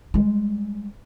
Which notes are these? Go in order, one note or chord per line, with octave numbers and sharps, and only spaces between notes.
G3 G#3